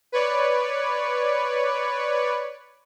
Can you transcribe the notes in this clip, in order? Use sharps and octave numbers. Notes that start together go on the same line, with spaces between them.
B4 C#5 D5